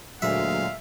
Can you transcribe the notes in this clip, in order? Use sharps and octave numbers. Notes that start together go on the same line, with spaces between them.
D2 A#2 F#3 G#3 E5 F5